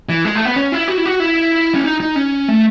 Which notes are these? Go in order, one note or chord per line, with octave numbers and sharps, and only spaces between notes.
E3
G#3
A3
B3
C#4
E4
F#4
E4
F#4
E4
C#4
D#4
D#4
C#4
A3